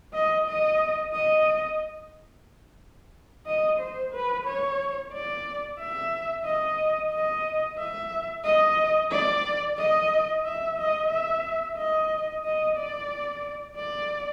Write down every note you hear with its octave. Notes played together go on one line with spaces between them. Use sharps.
D#5
D#5
D#5
D#5
C5
B4
C#5
D5
E5
D#5
D#5
E5
D#5
D5
D#5
E5
D#5
E5
D#5
D#5
D5
D5